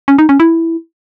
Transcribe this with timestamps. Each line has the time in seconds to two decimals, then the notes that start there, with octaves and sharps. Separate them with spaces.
0.08 C#4
0.18 D#4
0.29 C#4
0.40 E4